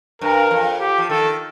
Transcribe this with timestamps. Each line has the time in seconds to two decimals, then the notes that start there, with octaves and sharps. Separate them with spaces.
0.21 G2 A#4
0.51 F2
0.80 G4
0.98 F3
1.10 D#3 A4